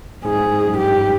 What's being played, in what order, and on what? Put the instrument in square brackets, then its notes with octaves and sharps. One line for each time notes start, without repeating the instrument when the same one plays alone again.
[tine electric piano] G#2 [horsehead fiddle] G#4
[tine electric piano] G#2
F#2
[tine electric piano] G2 [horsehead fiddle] G4